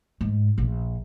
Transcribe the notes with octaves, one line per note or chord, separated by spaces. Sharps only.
G#2
A#1